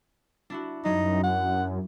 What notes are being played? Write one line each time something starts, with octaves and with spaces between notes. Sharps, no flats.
D4 E4 F#4
F#2 F#3 D#4
F#5